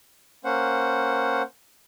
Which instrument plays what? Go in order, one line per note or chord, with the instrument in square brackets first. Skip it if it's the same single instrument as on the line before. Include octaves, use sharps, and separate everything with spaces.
[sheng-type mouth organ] A#3 C#4 C5 F#5